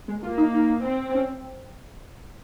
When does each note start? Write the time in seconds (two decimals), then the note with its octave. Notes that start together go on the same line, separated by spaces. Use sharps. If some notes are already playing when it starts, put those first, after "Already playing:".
0.08 G#3
0.23 A#3 F4
0.38 D#4
0.54 D#4
0.84 C4
1.15 C#4